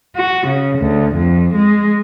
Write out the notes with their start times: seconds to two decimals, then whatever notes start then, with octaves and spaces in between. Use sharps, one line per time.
0.16 F#4
0.46 C#3
0.79 D2
1.14 F2
1.54 G#3